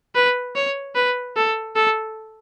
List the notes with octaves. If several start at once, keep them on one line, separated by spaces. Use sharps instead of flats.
B4
C#5
B4
A4
A4